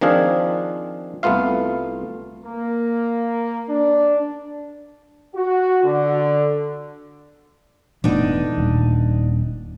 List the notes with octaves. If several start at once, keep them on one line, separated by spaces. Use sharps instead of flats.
D#3 F3 C4 D4 G#4 F5
C2 A3 B3 F4 F5
A#3
D4
F#4
D3
E1 A2 B3 D4 D#4 D#5
D#1